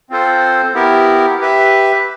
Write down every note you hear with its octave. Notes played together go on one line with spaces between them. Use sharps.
C4 F4 A4 C5
B3 E4 G4 A#4
G4 B4 E5